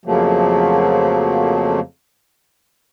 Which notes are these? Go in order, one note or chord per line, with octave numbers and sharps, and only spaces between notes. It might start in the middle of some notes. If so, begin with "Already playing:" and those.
F2 C#3 F3 F#3 A3 A#3